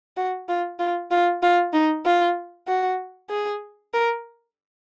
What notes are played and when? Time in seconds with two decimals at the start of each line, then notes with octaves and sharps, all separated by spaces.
0.17 F#4
0.49 F4
0.79 F4
1.11 F4
1.43 F4
1.74 D#4
2.05 F4
2.68 F#4
3.30 G#4
3.94 A#4